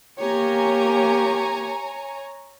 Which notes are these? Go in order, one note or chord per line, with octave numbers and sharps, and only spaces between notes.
A#3 G4 C#5 G#5 A#5